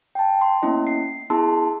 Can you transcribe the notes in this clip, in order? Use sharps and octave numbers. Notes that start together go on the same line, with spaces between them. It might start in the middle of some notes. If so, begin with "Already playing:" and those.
G5 A5
C6
A#3 B3 C#4 E4 D#5
C7
B3 E4 G#4 A5 C6 E6